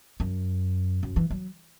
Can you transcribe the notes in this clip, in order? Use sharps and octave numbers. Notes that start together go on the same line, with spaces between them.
F#2
F#2
E3
F#3